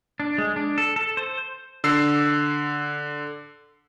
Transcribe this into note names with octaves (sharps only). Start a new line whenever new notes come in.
D4
G#3
D4
A4
A4
C5
D3 E6 C7